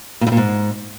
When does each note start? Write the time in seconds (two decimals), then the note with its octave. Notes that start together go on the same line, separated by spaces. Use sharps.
0.21 A#2
0.27 A2
0.32 A#2
0.37 G#2